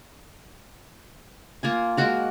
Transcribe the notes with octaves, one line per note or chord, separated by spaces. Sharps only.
A#3 F4 G#5
G#3 A#3 F#4 A#4